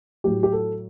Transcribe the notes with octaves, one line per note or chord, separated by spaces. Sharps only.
A2 F#3 G4
G4
A4